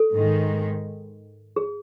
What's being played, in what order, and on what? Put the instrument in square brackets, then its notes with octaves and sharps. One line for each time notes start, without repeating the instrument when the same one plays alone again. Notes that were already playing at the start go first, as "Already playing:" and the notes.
Already playing: [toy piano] A4
[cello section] G#2 D#3 G#3
[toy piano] G#4